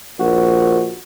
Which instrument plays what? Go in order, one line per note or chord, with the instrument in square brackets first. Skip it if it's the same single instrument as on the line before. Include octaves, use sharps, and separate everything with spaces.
[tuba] A#1 [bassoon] F#4